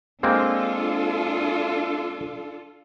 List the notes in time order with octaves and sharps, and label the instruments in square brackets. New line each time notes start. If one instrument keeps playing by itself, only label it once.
[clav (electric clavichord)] G#3 A#3 C4 [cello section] D4 F4 A4